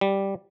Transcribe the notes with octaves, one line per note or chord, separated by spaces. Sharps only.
G3